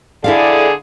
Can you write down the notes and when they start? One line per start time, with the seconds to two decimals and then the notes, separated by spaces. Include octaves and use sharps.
0.24 D3 E4 G#4 A4 D5 F5